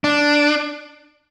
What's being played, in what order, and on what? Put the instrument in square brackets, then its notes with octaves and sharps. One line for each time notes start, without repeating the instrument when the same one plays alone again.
[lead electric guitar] D4